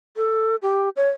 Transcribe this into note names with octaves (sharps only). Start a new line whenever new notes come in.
A4
G4
C#5